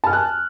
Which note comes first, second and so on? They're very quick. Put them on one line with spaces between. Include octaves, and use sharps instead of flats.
A5 F6 G#5 F#6